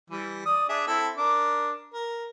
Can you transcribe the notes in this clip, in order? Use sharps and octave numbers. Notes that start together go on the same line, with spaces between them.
E3 G3
D5 D#6
D4 G#4 E5
C4 E4 A4
D4 A#4 D6
A#4